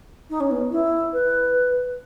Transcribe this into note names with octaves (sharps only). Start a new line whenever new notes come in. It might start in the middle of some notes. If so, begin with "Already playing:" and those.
D#4
C#4
B3
E4
B4